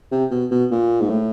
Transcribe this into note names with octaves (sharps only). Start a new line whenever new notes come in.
C3
B2
B2
A#2
G#2
A2